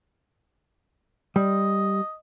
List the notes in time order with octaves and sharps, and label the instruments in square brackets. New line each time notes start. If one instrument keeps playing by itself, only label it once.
[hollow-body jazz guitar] G3 [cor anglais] D#5